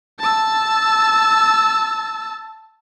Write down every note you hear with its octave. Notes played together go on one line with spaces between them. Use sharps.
A5 E6